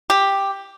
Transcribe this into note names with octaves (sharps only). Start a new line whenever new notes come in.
G4